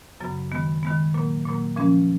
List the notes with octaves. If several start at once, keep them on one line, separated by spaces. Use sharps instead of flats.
F#2 C#3 F#3 B3
D#3 G#3 B3
D#3 G#3 B3
A#2 F#3 A#3
A#2 F#3 A#3
A#2 F3 G#3 C#4